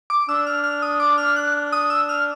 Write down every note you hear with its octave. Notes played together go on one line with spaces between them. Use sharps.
D6
D4 E6
F6
F6
D#6
D6
F6
F#6
D#6
E6
F6